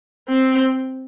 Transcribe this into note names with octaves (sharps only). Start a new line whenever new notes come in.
C4